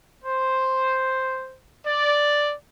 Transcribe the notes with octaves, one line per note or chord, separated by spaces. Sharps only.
C5
D5